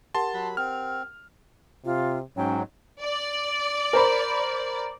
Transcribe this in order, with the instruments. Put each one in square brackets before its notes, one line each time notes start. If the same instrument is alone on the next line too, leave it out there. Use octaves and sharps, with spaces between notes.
[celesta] G4 A#4 F#5 [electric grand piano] A5 C6
[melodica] F#3 B5
[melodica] C4 [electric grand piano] F6
[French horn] C3 [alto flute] F4
[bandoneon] G#2 F#3 [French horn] C#4 [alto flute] G5
[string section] D5
[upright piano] A#4 C5 B5